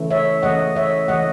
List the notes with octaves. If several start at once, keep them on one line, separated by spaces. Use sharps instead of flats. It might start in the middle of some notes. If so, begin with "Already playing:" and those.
Already playing: C#3 E3 A3
C#5 E5
C#3 E3 A3 D#5 F#5
C#5 E5
C#3 E3 A3 D#5 F#5